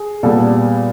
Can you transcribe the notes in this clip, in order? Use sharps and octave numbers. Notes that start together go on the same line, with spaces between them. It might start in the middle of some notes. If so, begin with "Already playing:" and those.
Already playing: G#4
A#2 G3 B3 A4